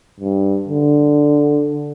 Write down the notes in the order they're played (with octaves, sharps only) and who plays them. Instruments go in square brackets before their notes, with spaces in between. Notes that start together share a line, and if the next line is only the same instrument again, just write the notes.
[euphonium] G2
D3